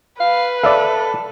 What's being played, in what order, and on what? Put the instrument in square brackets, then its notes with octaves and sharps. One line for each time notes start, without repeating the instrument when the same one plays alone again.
[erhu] B4 [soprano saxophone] F5
[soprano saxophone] A4 [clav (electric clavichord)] D5 E5 F5